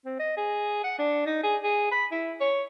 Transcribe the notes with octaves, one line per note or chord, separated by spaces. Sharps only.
C4
D#5
G#4
F#5
D4
D#4
G#4
G#4
B5
E4
C#5